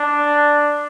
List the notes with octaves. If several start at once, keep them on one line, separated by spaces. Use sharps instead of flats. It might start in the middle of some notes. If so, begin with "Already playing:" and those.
Already playing: D4